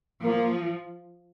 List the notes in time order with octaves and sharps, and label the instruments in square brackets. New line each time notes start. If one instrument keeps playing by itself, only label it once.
[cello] F3 [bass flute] A#3